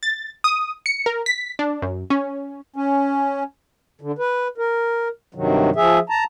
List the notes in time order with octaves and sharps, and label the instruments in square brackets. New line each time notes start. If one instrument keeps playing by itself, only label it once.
[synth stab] A6
D#6
C#7
A#4
B6
D4
F#2
C#4
[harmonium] C#4
D3
B4
A#4
G2 C3 D#3 F#3
F3 G#4 E5
A5 A#5